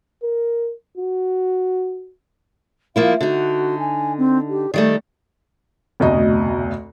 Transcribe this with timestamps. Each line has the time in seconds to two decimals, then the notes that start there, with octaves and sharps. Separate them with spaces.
0.23 A#4
0.97 F#4
2.96 F3 A#3 E4 F5
3.21 D3 D#4 F#4
3.79 G#5
4.18 C4
4.49 G4
4.74 D#3 G3 A3 D5
6.00 F1 D2 B2 D#5